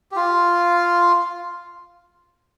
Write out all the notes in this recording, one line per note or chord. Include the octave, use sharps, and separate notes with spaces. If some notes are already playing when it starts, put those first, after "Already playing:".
G4
F4